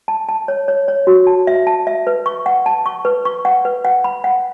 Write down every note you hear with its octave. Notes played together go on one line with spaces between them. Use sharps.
A5
A5
C#5
C#5
C#5
F#4
A5
E5
A5
E5
B4
C#6
F#5
A5
C#6
B4
C#6
F#5
B4
F#5
B5
F#5